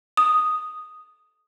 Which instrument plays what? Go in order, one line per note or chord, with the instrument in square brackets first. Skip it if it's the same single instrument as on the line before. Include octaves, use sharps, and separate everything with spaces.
[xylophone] D#6